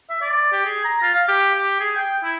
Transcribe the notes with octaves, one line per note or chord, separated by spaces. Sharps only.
E5
D5
G4
G#4
A#5
F4
F5
G4
G4
G#4
G5
E4